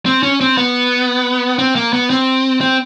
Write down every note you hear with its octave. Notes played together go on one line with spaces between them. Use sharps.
C4
C#4
C4
B3
C4
A#3
B3
C4
C4